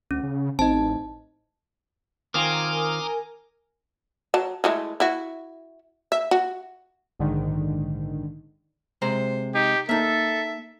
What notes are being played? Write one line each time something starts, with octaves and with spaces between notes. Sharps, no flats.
D2 C#4
C#3
A1 C4 D#4 D#5 A5
D#3 C4 F4 A#4 G#5 D6 D#6 F6
F#3 A5
E3 G#3 A3
E4 F#4
E5
F#4
A#1 G#2 D3 D#3
C3 G#3 C5 A#5
D#4 G4
A#3 D#4 A4 E5